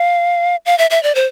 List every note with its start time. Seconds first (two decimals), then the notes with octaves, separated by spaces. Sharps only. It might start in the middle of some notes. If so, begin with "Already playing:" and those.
Already playing: F5
0.66 F5
0.78 E5
0.90 E5
1.03 D5
1.15 C5